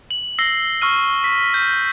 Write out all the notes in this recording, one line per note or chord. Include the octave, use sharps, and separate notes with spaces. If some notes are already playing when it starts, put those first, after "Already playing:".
F#7
E6 A#6 C7
C#6 E6 F6 D#7
B6
G6